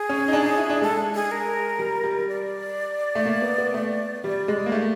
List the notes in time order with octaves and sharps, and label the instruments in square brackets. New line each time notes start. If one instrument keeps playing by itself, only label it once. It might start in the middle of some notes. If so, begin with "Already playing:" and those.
Already playing: [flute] G#4
[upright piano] C#4
D#4
D4
D#4
E4
D4
[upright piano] G#3 [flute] A4
[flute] G#4
A#4
[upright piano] G3
G3
[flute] D5
[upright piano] A3
A#3
B3
B3
A3
[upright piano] G3 [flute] D5
[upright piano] G#3
A#3
A3